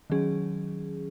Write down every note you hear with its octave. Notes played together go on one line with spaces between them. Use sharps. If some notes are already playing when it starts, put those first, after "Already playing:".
D#3 F#3 C#4 G#4